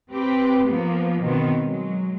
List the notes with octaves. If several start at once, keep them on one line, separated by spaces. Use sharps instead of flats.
C4 G4 B4
F3 A#3 B3
B2 D#3 B3 C4
F#3 G#3